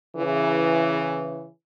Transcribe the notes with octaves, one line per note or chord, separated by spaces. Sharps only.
C#3 E3